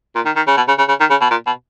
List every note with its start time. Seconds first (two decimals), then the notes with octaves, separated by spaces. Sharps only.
0.16 A#2
0.26 D#3
0.36 D#3
0.47 C#3
0.57 B2
0.68 C#3
0.79 C#3
0.89 C#3
1.00 D#3
1.10 C#3
1.21 B2
1.30 A#2
1.47 B2